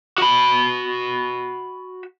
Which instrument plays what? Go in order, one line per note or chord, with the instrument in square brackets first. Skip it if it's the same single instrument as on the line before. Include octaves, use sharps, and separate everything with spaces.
[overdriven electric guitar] F#4 B5